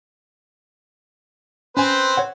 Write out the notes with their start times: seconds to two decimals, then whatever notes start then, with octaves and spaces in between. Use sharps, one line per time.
1.77 C4 C#4 B4 C5 G#5
2.17 C#5 F#5